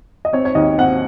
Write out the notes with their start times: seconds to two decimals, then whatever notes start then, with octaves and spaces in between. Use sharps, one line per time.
0.25 D#5
0.33 C4 C#5
0.45 C#5
0.55 D#2 D#5
0.78 C4 F#5